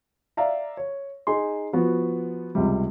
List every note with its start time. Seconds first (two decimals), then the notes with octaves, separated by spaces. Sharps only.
0.37 D5 E5 F5 A#5
0.77 C#5
1.27 D#4 G#4 C6
1.73 F3 B3 F#4
2.55 C#2 C3 G3